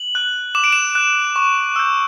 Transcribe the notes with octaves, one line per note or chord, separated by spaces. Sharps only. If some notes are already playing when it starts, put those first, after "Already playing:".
Already playing: F#7
F#6
D6 E7
D7
E7
F#6
C#6
E6 G6